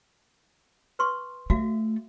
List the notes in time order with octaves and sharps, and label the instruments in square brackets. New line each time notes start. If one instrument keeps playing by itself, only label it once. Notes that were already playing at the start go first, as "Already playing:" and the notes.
[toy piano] B4 C6 C#6
[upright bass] A3 [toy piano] F#4 E5 F5